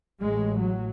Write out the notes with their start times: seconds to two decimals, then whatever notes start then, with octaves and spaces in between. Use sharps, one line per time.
0.21 A1 A2 G#3
0.61 F#3